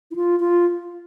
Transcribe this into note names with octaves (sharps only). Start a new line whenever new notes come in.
E4
F4
F4